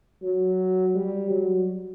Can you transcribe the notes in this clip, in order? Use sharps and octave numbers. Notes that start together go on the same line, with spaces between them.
F#3
G3
F#3